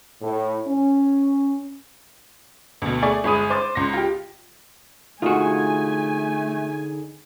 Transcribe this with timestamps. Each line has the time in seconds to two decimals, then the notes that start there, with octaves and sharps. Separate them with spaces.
0.21 A2
0.68 C#4
2.82 D2 B2
3.02 A3 G#4 D5 C#6
3.24 G1 G#3 G#4 B5 D#6 D#7
3.50 C5 D6 A6
3.75 C#2 C6 A#6
3.93 F4 G4
5.22 D3 A3 D#4 F4 F#4 G#4 G#5